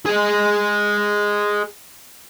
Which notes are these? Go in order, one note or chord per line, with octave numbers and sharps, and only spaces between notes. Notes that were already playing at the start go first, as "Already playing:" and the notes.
G#4 D#5